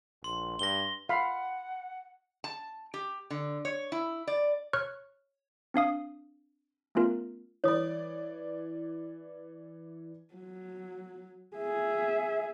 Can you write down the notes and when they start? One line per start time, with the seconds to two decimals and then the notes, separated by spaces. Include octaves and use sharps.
0.24 A#1 C6
0.59 G2 A#6 G7
1.09 F5 F#5 B5
2.44 A5
2.94 G4
3.30 D3
3.65 C#5
3.92 E4
4.27 D5
4.73 C#5 C#6 F6 F#6
5.74 C4 D4 F5 D#6
6.95 A3 B3 C#4 F4 A#4
7.64 E3 C#5 D5 D#6
10.34 F#3
11.57 G#4 E5